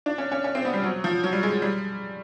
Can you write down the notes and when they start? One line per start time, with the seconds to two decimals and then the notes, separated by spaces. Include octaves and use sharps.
0.06 D4
0.18 C#4
0.32 C#4
0.44 C#4
0.55 C4
0.65 B3
0.74 G3
0.84 F#3
1.04 F3
1.24 F#3
1.33 G3
1.43 G#3
1.62 G3